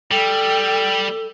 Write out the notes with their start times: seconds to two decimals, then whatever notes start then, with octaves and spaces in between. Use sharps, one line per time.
0.11 G3 A4 G5